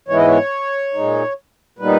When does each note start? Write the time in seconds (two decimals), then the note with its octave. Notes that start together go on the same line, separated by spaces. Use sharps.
0.08 G#2 E3 G#3 B3 E4 C#5
0.17 D#5
0.27 C#5
0.94 A#2 G#3 D#4
1.78 A#2 G3 B3 D#4 B4